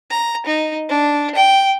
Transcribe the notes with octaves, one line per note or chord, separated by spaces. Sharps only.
A#5
D#4
D4
G5